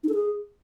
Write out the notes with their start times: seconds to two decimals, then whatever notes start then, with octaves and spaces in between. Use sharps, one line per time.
0.04 D#4
0.09 A4
0.14 G#4